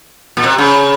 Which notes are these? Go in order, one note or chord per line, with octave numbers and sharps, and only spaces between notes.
A#2
C3
C#3